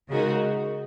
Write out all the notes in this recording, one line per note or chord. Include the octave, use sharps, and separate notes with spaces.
C#3 G#3 D#4 F#4 A#4